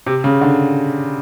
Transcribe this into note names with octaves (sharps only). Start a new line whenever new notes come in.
C3
C#3
D3